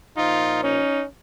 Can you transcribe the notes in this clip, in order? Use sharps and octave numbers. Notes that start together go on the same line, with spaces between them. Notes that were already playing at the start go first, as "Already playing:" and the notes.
A#2 F3 D#4 F4
C#4 D#4